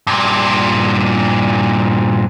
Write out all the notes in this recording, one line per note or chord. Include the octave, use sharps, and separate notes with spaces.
G2 A#2